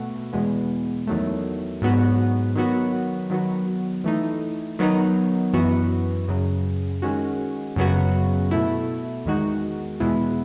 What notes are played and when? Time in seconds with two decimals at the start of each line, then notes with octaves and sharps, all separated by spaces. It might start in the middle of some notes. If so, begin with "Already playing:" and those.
Already playing: B2 A3 F#4
0.33 E2 B2 G#3 B3
1.07 E2 D#3 F#3 A3
1.82 G#2 F#3 B3 F#4
2.55 D#3 F#3 B3 F#4
3.30 D#3 F#3 B3 F#4
4.04 E3 A3 D#4
4.79 D#3 F#3 B3 D#4
5.53 F#2 E3 B3 F#4
6.28 F#2 C#3 F#3
7.02 D#3 G#3 C#4 F#4
7.76 F#2 C#3 F#3 B3 F#4
8.51 B2 A3 E4
9.26 E2 D#3 G#3 D#4 F#4
10.00 E2 B2 G#3 B3 E4